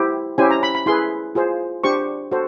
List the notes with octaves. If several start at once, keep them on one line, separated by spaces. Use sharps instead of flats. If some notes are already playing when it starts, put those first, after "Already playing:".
Already playing: E4 G4 C5
C#4 E4 G4 C5 G#5
A#5
B5
B5
E4 G#4 B4 C6
F4 G#4 C5
D4 G4 C5 C#6
F#4 A4 C5